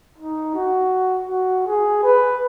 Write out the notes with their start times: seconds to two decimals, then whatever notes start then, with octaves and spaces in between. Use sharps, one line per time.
0.18 D#4
0.55 F#4
1.29 F#4
1.67 G#4
2.03 B4